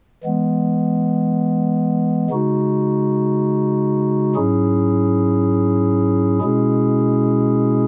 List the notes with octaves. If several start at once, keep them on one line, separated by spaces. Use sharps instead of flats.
E3 G#3 B3
C#3 G#3 D#4 F#4
G#2 F#3 C#4 E4 G#4
B2 G#3 C#4 E4 G#4